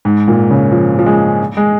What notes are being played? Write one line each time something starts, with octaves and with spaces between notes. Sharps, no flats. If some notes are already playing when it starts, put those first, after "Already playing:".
G#2
A#2
C#3
F3
F3
G#3
G#3